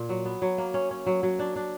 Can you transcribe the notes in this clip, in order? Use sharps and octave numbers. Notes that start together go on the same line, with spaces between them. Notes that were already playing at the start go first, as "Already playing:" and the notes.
Already playing: A#2
F#3
B3
F#3
A#3
C#4
C#4
F#3
F#3
D4
D4